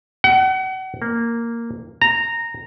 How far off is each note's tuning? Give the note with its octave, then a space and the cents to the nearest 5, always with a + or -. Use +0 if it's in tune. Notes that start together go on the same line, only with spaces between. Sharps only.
F#5 +35
A#3 -5
A#5 -10